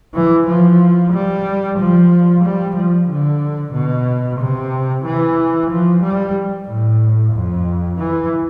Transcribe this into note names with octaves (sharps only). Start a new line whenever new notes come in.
E3
F3
G3
F3
G3
F3
D3
B2
C3
E3
F3
G3
A2
F2
E3